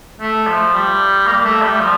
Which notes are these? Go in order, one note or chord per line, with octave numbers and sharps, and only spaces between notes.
A3
F3
G3
A#3
A3
G3
F3